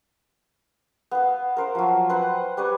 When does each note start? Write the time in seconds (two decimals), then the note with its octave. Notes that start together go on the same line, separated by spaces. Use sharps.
1.11 B3 F5
1.57 A#4 C5 F5
1.75 F3 F#3
2.09 B4 C5 F#5 G5
2.57 G3 B4 C#5